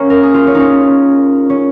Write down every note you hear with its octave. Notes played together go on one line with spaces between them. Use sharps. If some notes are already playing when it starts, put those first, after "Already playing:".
Already playing: A#3 C#4
A#4
G#4
F4
C#4
D#4
C#4
C#4